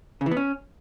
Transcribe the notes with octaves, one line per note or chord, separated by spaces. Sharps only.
C#3
E3
B3
C#4